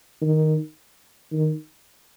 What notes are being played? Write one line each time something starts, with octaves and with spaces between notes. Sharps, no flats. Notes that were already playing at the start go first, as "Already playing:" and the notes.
D#3
D#3